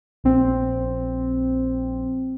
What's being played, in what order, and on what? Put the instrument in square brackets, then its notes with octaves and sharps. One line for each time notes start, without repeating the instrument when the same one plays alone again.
[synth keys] A#1 C4